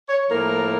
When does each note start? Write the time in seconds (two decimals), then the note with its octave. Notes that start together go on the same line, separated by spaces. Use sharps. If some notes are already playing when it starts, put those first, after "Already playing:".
0.09 C#5
0.28 A2 F3 A#3 A#4